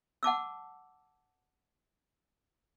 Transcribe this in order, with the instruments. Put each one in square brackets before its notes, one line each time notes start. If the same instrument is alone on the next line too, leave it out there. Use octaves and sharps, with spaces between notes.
[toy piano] F#5 A5 D6 E6